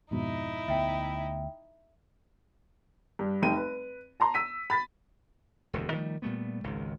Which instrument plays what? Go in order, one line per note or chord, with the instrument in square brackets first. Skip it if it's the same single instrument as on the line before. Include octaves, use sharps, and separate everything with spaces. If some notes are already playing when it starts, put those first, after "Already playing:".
[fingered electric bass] F2 G#2 B2 [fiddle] D#4 E4
[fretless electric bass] D2 B3 [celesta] E5 G5
[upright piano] G2
F1 D#4 G5 D#7
B4
A5 A#5 C6
E6 B6 D#7
B5 A6 B6
[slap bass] E1 D2 G2
D#3 F3 G3 A3
A#2 G3 A3 B3
G#1 C#2 D#3